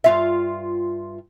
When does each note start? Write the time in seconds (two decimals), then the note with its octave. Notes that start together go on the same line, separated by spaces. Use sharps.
0.04 G2 F4 E5